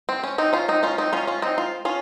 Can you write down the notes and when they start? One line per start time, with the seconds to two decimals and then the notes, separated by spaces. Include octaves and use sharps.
0.09 C4
0.24 C#4
0.38 C4 D#4
0.53 C#4 F4
0.68 C4 D#4
0.83 C#4 F4
0.98 C4 D#4
1.13 C#4 F4
1.27 C#4 F4
1.42 C4 D#4
1.58 F4
1.85 C#4 F4